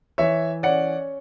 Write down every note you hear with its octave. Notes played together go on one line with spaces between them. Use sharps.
E3 C#5 E5
C#4 D5 F#5